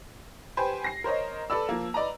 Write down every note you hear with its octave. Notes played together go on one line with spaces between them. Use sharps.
G4 B4 C5 G#5
A#6 C7
A#4 C5 C#5 D#5
A4 B4 D5 E6
F3 A#3
B4 D5 D#5 A#5